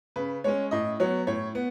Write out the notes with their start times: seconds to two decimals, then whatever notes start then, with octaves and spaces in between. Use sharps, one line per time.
0.16 C#3 B4
0.44 G#3 C#4 C#5
0.71 A2 D#5
1.00 F#3 B3 C#5
1.27 A2 C#5
1.55 B3